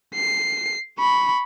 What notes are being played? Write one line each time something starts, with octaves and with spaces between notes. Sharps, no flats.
C7
B5 C#6